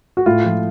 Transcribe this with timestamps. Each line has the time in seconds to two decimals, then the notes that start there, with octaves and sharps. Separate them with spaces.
0.17 F#4
0.26 A2 F4
0.45 F3